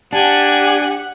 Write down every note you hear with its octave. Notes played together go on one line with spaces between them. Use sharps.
D4 G4 F#5 G#5